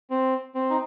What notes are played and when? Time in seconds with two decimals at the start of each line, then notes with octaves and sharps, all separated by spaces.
0.10 C4
0.55 C4
0.70 D#4